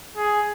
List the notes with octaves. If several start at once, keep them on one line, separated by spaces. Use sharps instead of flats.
G#4